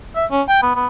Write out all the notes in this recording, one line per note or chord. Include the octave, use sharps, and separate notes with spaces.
E5
C#4
G5
B3
B3